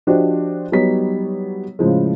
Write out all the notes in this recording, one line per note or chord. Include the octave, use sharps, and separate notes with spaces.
F3 D4 F#4 G4 C5 D#5
F#3 G3 B3 D#4 C#5 B6
A2 C#3 F3 G#3